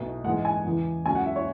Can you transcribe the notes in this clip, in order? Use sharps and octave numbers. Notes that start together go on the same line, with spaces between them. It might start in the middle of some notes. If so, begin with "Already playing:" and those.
Already playing: B1 B2 A3
G#2 E3 G#3 B3 F#5
G#5
E2 C#3 E3 B3
C#2 C#3 F#3 C#4 G#5
F#5
E5
C#5